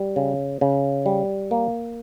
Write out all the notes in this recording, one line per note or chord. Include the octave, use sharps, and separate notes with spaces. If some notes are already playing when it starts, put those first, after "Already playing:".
Already playing: G3
C#3
C#3
G3
A#3